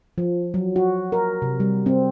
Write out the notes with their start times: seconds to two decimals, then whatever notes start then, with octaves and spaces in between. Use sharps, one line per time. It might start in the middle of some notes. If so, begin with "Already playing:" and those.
0.18 F3
0.54 F#3
0.76 F#4
1.12 A#4
1.42 C3
1.60 G3
1.86 C4